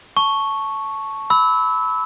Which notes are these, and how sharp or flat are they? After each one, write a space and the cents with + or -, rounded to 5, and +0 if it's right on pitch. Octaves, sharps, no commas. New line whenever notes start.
A5 +0 C#6 +0
B5 +15 E6 -25